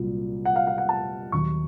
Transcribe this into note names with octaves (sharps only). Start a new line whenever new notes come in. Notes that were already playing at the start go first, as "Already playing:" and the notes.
Already playing: C2 A#2 F#3
F#5
F5
F5
F#5
A5
D#2 D#3 F#3 C#6